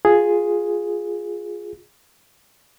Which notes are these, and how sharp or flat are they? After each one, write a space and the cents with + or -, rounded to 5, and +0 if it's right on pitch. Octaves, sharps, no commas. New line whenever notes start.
F4 +10 G#4 +0